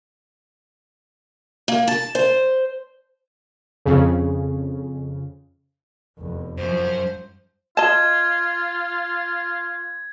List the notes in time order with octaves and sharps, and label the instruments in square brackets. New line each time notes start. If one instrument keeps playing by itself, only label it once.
[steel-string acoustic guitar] A#3
A5
C5
[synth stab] F2 C#3
[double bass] F1 E2
[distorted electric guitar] F#2 [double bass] F3 [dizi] C5
[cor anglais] F4 [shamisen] D#5 A5 [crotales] G#6